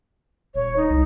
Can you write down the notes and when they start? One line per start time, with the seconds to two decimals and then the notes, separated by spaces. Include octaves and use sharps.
0.54 D#1 C#5
0.76 D#4
0.89 C2